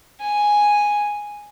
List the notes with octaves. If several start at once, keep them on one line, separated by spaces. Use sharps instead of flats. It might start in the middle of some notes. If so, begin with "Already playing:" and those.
G#5